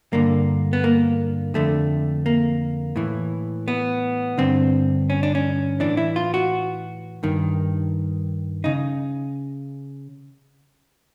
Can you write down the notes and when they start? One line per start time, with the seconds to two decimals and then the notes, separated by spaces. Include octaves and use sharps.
0.13 G2 D3 A#3
0.73 B3
0.84 A#3
1.54 F2 D3 A3
2.26 A#3
2.96 A2 E3
3.68 B3
4.38 G2 D3 C4
5.10 C#4
5.23 D4
5.35 C#4
5.80 A2 E3 D4
5.97 E4
6.16 F4
6.34 F#4
7.23 G2 D#3
8.64 C#3 D#4